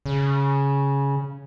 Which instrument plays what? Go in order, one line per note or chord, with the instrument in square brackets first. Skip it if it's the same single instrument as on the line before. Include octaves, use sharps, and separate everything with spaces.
[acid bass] C#3